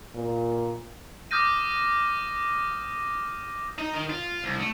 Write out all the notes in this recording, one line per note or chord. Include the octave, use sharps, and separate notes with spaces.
A#2
D6 D#6 F6 G6 A#6 D#7
D#4
D#3
F4
C2
A3